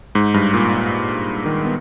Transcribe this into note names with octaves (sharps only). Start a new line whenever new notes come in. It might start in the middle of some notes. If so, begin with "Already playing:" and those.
G#2
G2
A#2
A#2
D#3
B3